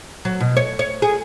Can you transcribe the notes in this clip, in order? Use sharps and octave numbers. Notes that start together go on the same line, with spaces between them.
F#3
B2
C#5
C#5
G#4